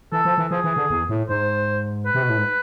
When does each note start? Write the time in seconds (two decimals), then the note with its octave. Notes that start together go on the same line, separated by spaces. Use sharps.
0.12 E3 A4
0.25 F3
0.38 E3
0.51 F3 G#4
0.64 E3
0.76 D3
0.90 E2
1.09 A2
1.29 G#2 C5
2.06 B4
2.15 C3
2.23 B2
2.29 A2
2.37 G#2